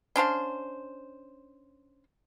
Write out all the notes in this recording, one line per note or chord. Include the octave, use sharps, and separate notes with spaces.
C#4 D4 C5 F5